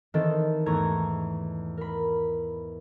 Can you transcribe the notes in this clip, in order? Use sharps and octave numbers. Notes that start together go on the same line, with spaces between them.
D#3 E3 C4 A4 D#5
E2 G#2 A3 A#5 C#6 G#6
A#4 B5